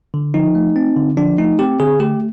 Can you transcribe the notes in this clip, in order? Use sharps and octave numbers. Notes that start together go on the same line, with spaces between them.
D3
F3 D#4
A3
C4
D3
F3 D4
A3 D#4
C4 G4
D3 G#4
A3 G4